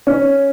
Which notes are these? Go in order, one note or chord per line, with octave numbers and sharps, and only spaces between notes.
C#4